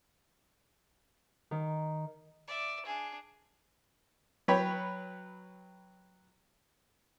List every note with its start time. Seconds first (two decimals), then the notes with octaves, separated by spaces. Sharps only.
1.51 D#3
2.48 D5 E5
2.85 D4 G#4
4.48 F#3 B4 C#5 G5 B5